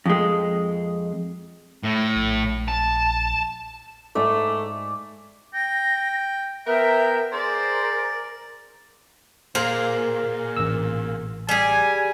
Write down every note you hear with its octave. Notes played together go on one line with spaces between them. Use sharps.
F2 G#3
A2
A#1
A5
G#2 A3 D5 G#5
G5 A#6
B3 A#4 E5 G5
G#4 A#4 C5 D5
A#2 A#3 G#4 A#4 C5 F5
A1 E6
G3 G#4 G#5